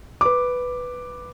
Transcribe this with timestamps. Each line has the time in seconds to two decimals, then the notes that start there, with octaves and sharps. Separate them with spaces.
0.21 B4 D6